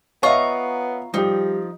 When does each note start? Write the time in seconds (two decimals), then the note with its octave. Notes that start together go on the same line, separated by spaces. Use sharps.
0.23 B3 F4 C#5 D#5 E5 A#5 C#6
1.14 F3 G3 D#4 G4